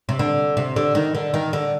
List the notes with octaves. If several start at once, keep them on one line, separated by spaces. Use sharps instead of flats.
C3
D3
C3
D3
D#3
D3
D#3
D3